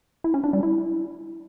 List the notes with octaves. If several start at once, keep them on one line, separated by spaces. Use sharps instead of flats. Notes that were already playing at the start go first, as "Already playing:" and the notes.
E4
C#4
D4
G3
E4